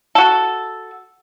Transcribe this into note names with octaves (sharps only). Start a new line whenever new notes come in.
F#4 A4